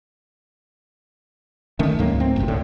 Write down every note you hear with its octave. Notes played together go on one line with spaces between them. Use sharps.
D3 D#3 A3 C#4
C#2 G#2 F#3 A#3
A3 C4
G#1 C#2 G2 C3
A2 D3